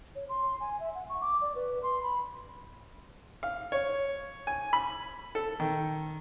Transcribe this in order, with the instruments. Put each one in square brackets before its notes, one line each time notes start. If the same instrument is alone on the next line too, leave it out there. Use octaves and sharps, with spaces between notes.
[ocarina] C#5
C6
G#5
E5
F#5
C#6
D6
D5
B4
C6
B5
[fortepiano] F5
C#5
G#5
B5
A4
D#3